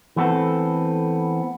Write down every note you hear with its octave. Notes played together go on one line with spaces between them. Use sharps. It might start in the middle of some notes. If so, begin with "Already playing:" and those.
E3 A3 B3 C4 A4